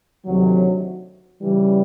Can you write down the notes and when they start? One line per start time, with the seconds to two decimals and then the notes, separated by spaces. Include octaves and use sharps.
0.24 D2 C3 D#3 F#3
1.41 C#3 E3 G3